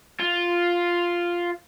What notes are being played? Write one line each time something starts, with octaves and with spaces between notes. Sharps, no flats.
F4